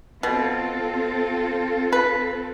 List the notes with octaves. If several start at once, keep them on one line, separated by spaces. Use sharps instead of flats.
B2 C4 F4 A4
B4